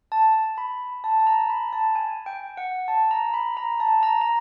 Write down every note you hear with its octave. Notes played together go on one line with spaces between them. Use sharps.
A5
B5
A5
A5
A#5
B5
A5
G#5
G5
F#5
A5
A#5
B5
A#5
A5
A#5
A#5